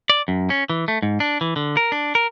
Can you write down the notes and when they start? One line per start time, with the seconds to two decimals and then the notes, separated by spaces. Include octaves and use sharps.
0.10 D5
0.28 F#2
0.50 C#4
0.70 E3
0.88 A3
1.02 G#2
1.20 D4
1.41 E3
1.56 D3
1.77 A#4
1.92 D4
2.15 A#4